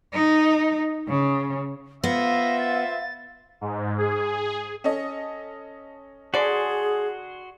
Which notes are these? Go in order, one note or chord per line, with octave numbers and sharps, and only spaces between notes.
D#4
C#3
B3 F4 C5 E5 F5 A#6
A6
G#2
G#4
C#4 A4 D#5
D3 F#4 G#4 D5 C6